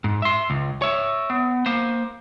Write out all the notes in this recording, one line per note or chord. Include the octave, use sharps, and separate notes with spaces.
G#2
E5 C6
C#2
C#5 E5
B3
A#3 C5